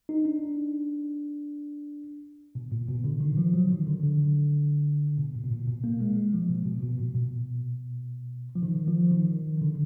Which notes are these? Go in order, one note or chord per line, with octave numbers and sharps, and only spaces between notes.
D#4
D4
B2
A#2
B2
D3
D#3
F3
F#3
D#3
D3
D3
B2
A#2
B2
A#2
B2
A#3
G#3
G#3
F3
B2
B2
B2
A#2
B2
F3
D#3
F3
D#3
D3